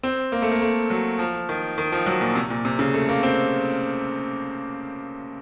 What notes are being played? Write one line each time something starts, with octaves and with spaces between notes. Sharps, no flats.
C4
A#3
A3
A#3
A3
F#3
F3
D#3
D#3
F3
F#3
A#2
C3
A#2
C3
C#3
A3
A#3
C4